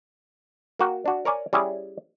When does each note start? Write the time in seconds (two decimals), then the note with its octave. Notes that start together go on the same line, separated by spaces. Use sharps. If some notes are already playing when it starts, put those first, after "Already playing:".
0.79 A#3 F#4 G5
1.06 D4 F#4
1.25 A#4 C#5 D5 G#5
1.53 G3 C#4 E4 G#4